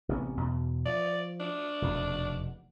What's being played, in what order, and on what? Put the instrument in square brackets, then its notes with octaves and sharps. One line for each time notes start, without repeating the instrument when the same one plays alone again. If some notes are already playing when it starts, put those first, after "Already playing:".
[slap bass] A1 C3 B3
E2 B2
[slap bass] F3 [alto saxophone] D5
[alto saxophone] D4
[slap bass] F1 E2 B2